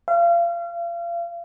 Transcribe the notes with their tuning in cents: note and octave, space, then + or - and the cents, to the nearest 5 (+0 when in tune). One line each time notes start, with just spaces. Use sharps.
F5 -35